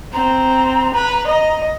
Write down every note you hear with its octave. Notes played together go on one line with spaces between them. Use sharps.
C4 A#5
B4
D#5